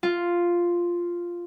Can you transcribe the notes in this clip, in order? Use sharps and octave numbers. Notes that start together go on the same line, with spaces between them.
F4